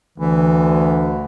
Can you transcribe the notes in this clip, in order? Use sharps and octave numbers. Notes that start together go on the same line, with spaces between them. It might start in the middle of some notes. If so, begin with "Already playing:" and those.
D2 E3